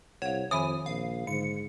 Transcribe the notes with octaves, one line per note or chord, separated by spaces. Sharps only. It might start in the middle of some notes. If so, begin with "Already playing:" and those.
C2 C#5 F5 F#5
F2 D#3 E5 G#5 B5 D#6
A#1 F5
G#2 D3 C#7